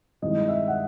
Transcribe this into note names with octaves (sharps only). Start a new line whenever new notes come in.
G2 D#3 G#3 C4 E4 D#5
E5
F#5